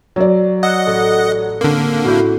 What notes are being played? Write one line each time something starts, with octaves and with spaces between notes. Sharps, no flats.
F#3 A#4 D5 E6
D#5 F#5 E6
A1 A4
D3 A#3 C4 C#4
A2 D4 E4 F#4 G6